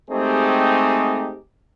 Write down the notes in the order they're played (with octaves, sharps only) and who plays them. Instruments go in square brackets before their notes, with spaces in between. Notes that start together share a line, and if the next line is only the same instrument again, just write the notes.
[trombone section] G#3 A3 C4 D#4 G4 G#4